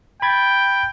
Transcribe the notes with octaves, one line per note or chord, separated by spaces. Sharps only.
G5 B5 G#6 A6